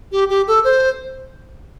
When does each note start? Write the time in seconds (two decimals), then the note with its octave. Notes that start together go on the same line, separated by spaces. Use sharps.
0.12 G4
0.30 G4
0.47 A4
0.64 C5